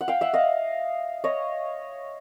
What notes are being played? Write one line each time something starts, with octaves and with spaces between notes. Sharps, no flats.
F#5
F5 G5
E5 F#5
D#5 F5
C#5 D#5